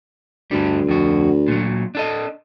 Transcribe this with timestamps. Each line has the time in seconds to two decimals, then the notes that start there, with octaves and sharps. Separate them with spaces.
0.51 D2 G2 D3 G3
0.88 F2 F#4
1.48 A#2 F#3
1.95 D4 A4 D#5